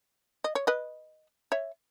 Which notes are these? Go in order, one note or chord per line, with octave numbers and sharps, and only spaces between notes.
D#5
C#5
B4 D#5
C#5 E5